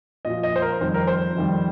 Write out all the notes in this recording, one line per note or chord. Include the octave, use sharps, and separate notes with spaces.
A#2 F3 D#5
D#5
C5
A#4
F2 D#3 G3 C5
A#4
C5
F2 D#3 G3